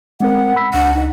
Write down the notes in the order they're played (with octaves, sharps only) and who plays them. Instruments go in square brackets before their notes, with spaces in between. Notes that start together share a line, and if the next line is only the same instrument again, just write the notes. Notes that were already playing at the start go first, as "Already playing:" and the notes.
[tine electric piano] G#3 C4 A#4 [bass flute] F#5
[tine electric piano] B5 E6 B6
[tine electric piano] C#2 [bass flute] D4 [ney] F#5
[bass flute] D#4